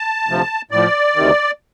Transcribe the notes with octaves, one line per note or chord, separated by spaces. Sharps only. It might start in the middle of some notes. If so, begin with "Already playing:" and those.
Already playing: A5
D2 C3 F3
A2 F3 D5
D2 C3 D#3